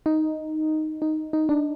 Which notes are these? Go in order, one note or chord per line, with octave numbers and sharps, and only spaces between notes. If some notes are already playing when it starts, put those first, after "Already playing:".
D#4
D#4
D#4
D4